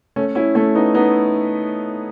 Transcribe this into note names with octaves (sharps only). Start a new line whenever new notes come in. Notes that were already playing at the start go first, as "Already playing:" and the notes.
A3 C#4
C#4 E4
A3 C#4
B3 D#4
B3 D#4